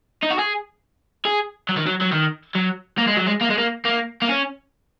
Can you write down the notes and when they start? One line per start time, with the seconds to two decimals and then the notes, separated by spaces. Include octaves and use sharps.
0.22 D#4
0.30 F#4
0.39 G#4
1.25 G#4
1.69 F#3
1.77 D#3
1.87 F#3
2.01 F#3
2.12 D#3
2.55 F#3
2.98 A#3
3.08 G#3
3.17 F#3
3.27 G#3
3.41 A#3
3.50 G#3
3.58 A#3
3.85 A#3
4.22 A#3
4.29 C#4